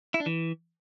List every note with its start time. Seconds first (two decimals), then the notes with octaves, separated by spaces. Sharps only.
0.14 E4
0.20 D4
0.26 E3